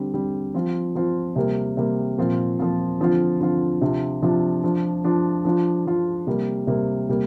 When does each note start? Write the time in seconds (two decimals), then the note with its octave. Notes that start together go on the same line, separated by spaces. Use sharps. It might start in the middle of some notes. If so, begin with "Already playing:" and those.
Already playing: D3 G3 C4
0.14 D3 G3 C4
0.54 F3 C4 F4
0.95 F3 C4 F4
1.36 C3 G3 A#3
1.77 C3 G3 A#3
2.18 A#2 F3 C4 F4
2.59 A#2 F3 C4 F4
3.00 D3 F3 C4 F4
3.41 D3 F3 C4 F4
3.81 C3 F3 D4 F4
4.22 C3 F3 D4 F4
4.63 F3 D4 F4
5.04 F3 D4 F4
5.45 F3 D4 F4
5.86 F3 D4 F4
6.27 C3 G3 A#3
6.67 C3 G3 A#3
7.09 C3 G3 A#3